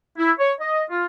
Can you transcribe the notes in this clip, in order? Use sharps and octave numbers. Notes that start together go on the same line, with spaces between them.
E4
C#5
D#5
F4